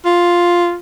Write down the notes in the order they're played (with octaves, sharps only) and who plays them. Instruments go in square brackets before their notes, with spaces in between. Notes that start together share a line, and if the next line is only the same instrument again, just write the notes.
[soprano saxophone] F4